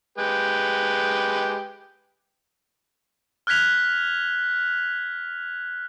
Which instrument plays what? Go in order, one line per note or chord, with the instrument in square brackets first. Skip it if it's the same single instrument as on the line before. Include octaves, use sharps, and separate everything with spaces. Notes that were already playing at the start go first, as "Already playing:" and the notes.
[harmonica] G#3 G4 B4
[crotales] F6 F#6 G#6 B6 F7